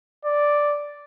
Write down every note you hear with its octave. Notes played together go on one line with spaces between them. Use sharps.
D5